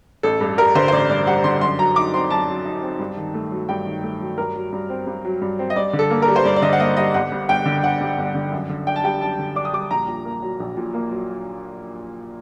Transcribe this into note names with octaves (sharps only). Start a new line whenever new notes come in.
A1 A4
G2 A4
G3 A#4
D3 C5
C5
A1 D5
G2 D5
G3 F#5
D3 C6
F#2 C6
F#3 A#5
D#4 D6
C4 C6
F#2 A5
F#3
D#4
C4
G2
D#3
A3
F#3
G2 G5
D#3
A3
F#3
G2 A#4
F#3
G2
C4
G2
F#3
G2
C4
D#5
G2 D5
D3
A4
A#3
A#4
G3
C5
G2 D5
D5
D3 D#5
F#5
A#3 D#5
G3 D#5
G1 F#5
G2
G1 G5
D3
G1 F#5
G2
G1
D3
F#2
D3
D4 G5
A5
G3 G5
F#2 A5
D3
D4 D6
D#6
G3 D6
A#1 A#5
A#2
A#3
F#3
A#1
A#2
A#3
F#3